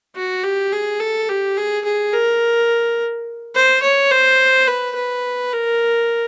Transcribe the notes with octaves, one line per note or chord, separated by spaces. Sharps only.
F#4
G4
G#4
A4
G4
G#4
G#4
A#4
C5
C#5
C5
B4
B4
A#4